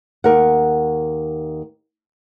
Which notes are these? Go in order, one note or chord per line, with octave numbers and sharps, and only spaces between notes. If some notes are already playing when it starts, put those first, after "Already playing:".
D#2 A#4 F#5